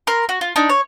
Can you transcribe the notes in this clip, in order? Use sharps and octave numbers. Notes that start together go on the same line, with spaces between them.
A#4 C6
F#4
F4
D4 D#4
C#5